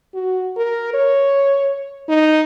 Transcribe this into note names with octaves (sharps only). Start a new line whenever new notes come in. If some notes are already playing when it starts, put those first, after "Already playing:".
F#4
A#4
C#5
D#4